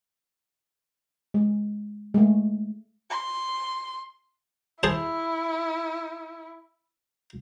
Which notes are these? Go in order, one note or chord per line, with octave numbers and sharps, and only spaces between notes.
G#3
G#3 A3
C6
E4 G#4 C5 A5